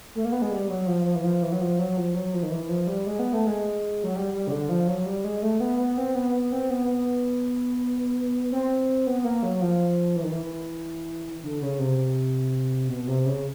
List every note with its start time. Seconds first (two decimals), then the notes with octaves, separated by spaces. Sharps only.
0.15 A3
0.25 A#3
0.32 B3
0.42 G#3
0.52 G3
0.69 F#3
0.87 F3
1.05 F3
1.15 E3
1.24 F3
1.43 E3
1.52 F#3
1.61 F3
1.79 F#3
1.97 F3
2.14 F#3
2.33 F3
2.43 D#3
2.51 E3
2.69 F3
2.87 G3
3.06 G#3
3.19 B3
3.33 A3
3.47 G#3
4.04 F#3
4.16 G3
4.33 G3
4.47 C#3
4.51 D3
4.69 F3
4.87 F#3
5.06 G3
5.24 G#3
5.42 A3
5.60 B3
5.79 B3
5.98 C4
6.15 B3
6.33 B3
6.52 C4
6.70 B3
6.88 B3
8.52 C4
9.07 B3
9.24 A#3
9.43 F#3
9.61 F3
10.16 E3
10.24 D#3
10.31 E3
11.43 D3
11.61 C#3
11.79 C3
12.88 B2
13.08 C3
13.26 C#3